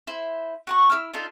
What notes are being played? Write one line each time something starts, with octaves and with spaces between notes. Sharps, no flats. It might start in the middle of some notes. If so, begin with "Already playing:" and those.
E4 C5
F#4 F#5 C#6
E4 C#5 E6 F6
D4 D#4 F4 A4